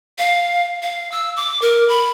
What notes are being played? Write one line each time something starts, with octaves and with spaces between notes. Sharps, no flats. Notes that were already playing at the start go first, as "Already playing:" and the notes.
F5
F5
E6
D6
A#4
B5